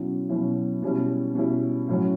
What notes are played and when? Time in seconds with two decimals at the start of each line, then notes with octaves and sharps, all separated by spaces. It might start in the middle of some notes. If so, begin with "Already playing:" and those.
Already playing: B2 F#3 C#4 E4
0.29 B2 F#3 C#4 E4
0.82 B2 G3 C#4 E4
1.35 B2 G3 C#4 E4
1.88 A2 F#3 C#4